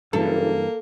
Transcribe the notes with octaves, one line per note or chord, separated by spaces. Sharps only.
F#1 G2 E3 A#3 A4